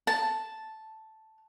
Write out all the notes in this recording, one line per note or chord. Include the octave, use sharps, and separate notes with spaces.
A5